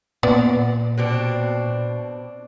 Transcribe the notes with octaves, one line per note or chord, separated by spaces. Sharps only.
A#2 B3 D5
B2 C4 D4